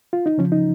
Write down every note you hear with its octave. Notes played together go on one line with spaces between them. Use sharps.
F4
D#4
C#3 F3 C#4
D#4